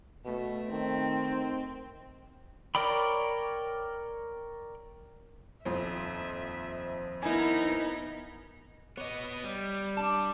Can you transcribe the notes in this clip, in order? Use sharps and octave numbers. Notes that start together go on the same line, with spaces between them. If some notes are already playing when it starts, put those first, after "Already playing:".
B2 A3
D#3 C4
A#4 C#5 D5 G5 B5
D#1 F2 C5 E5
B3 D#4 E4 A#4 G#5
B3 C#5 D#5
G3
D4 A5